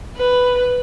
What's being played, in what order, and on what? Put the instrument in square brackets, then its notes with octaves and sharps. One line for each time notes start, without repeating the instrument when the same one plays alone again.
[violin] B4